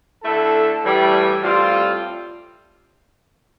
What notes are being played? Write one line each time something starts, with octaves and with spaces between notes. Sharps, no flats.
D3 A3 E4 A4
A2 E3 G3
A2 G3 C4 F4